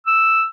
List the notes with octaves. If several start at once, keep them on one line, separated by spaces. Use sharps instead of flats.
E6